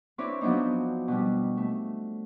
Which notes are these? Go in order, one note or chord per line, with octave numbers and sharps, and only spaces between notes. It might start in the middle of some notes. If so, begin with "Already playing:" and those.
C4 D4 E4 B4 C#5 D5
F3 F#3 B3 C4 D4 D#4
B2 G3
A3